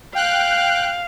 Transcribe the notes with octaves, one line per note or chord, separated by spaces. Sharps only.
F5 G5 F#6